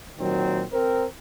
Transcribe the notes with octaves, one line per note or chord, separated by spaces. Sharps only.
A#2 D#3 F#3 C4
C4 A#4